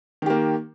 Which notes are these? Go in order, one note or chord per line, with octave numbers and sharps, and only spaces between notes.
D#3 A#3 G4